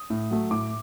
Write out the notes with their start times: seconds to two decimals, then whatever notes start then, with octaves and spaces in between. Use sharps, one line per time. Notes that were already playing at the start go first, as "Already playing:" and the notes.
Already playing: D#6
0.10 A2
0.31 F#3 A3
0.51 A2 D6